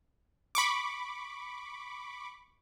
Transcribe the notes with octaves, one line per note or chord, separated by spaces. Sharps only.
B5 C#6 D6